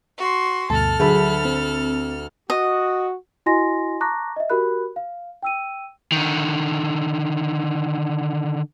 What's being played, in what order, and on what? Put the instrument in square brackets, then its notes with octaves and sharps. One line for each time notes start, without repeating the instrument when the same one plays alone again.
[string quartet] F#4 C6
[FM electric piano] D2 G2 B2 [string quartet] A4 F6 [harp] A5
[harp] D2 B4 [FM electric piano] F#3 G#4 E5
[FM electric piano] C4
[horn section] F#4 [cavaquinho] D#5
[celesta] E4 F#4 D#5 G#5 C6 A#6
A5 A#5 C#6 D6 F#6 A#6
D#5 E5
F#4 G4 A#4 B5 F#6
F5
G5 E6 D#7
[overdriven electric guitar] D3 D#3